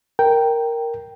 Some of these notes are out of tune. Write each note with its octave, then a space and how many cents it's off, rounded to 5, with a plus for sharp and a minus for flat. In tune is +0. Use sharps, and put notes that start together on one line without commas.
A#4 +0 G5 +0